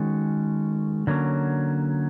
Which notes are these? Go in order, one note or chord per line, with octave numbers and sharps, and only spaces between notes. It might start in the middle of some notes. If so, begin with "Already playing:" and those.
Already playing: D#3 G#3 C#4 F#4 A4
D3 F#3 A#3 C#4